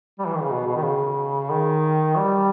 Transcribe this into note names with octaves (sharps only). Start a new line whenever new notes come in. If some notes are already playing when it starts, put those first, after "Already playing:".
G3
E3
D#3
C#3
B2
B2
D#3
C#3
D#3
G3